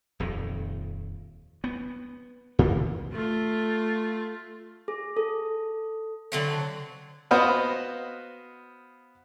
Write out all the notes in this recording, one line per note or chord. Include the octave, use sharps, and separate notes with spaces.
D#1 F2 A#2 D#3
B3
A2 D#3 F3 G#3
A3 F4
G#4
A4
D3 F#3 C4
B3 F#4 C5 D#5 F5 B5